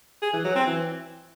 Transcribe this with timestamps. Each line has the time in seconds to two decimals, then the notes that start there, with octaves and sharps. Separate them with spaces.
0.22 G#4
0.33 E3
0.44 F#3
0.55 C4
0.66 E3